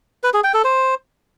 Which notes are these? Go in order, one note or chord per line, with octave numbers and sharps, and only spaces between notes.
B4
G#4
G5
A4
C5